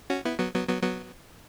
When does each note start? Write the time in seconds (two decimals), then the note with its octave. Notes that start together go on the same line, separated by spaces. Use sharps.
0.10 C#4 F#4
0.25 B3 E4
0.39 F#3 B3
0.54 F#3 B3
0.68 F#3 B3
0.83 F#3 B3